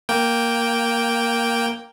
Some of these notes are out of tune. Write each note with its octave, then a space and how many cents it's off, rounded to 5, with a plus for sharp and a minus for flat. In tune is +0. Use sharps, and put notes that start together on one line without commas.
A#3 +0 G5 +0